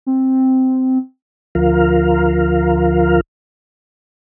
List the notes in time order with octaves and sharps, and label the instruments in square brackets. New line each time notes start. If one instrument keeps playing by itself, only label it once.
[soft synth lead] C4
[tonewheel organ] D2 F3 F4 A#4 F5